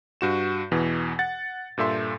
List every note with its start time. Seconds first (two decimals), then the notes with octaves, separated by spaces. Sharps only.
0.21 G2 F#4 E7
0.72 E2 B2 E3
1.19 F#5 A6
1.78 G2 A#2 A4 E5 C6